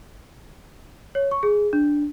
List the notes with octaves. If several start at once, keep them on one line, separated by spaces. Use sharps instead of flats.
C#5
C#6
G#4
D4